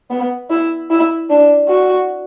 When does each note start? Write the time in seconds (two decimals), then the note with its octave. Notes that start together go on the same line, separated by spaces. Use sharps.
0.10 B3
0.50 E4
0.90 E4
1.30 D4
1.68 F#4